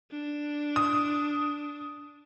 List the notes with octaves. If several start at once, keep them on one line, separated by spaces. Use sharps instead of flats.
D4
D#6